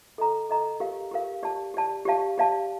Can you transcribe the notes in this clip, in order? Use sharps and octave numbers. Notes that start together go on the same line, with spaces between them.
A4 D#5 A#5
A4 D#5 A#5
G4 A#4 F5
G4 A#4 F5
G4 D5 A5
G4 D5 A5
G4 D5 F5 A5
G4 D5 F5 A5